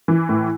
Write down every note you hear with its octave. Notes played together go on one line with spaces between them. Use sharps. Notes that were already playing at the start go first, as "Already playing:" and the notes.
E3
A2